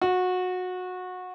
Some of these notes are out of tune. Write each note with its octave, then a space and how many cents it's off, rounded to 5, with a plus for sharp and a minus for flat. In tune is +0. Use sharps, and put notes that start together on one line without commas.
F#4 -20